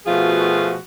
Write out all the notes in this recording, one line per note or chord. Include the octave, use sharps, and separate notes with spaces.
B2 F3 A3 F4 F#4 G#4